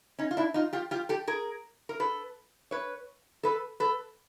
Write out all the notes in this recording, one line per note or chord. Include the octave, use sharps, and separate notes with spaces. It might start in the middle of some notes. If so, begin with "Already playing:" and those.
C#4 D#4
F4
D4 E4
D#4 F4
F4 G4
F4 G4
G4 A4
G#4 A#4
A#4
A4 B4
B4 C#5
A4 B4
A4 B4